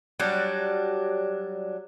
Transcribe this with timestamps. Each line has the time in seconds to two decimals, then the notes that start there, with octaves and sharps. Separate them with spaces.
0.19 F#3 G3 D4